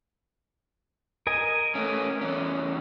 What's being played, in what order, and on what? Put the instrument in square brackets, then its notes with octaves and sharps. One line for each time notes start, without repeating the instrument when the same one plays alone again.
[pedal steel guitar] A#4 D#5 G#5
[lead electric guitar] A3 C#4
E2 C#4